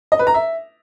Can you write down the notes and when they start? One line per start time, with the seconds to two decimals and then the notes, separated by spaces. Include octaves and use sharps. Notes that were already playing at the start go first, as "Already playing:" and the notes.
0.12 D#5
0.19 B4
0.27 A#5
0.34 E5